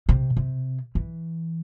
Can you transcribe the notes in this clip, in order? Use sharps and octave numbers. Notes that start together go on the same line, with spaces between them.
C3
C3
E3